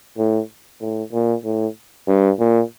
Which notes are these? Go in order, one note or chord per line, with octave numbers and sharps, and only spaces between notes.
A2
A2
A#2
A2
G2
A#2